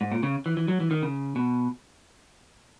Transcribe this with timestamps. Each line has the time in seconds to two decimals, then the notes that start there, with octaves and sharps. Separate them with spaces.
0.01 G#2
0.12 A#2
0.23 C#3
0.46 E3
0.57 E3
0.68 F#3
0.80 E3
0.91 D#3
1.03 C#3
1.36 B2